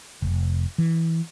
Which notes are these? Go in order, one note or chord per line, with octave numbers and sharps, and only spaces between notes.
F1
E3